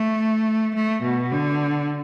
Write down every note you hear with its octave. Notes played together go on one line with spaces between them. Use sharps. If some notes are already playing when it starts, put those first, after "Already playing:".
Already playing: A3
A3
B2
D3